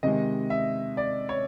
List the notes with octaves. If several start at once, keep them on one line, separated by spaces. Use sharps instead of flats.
C3 D#3 G#3 D#5
E5
D5
C#5